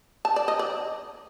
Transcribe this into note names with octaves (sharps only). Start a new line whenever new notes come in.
A5
D5
D#5
D5